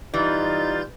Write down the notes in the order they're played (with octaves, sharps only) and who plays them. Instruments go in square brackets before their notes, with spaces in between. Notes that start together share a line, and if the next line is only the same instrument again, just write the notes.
[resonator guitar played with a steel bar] E3 [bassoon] G3 [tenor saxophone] D#4 [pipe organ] F4 G6 A6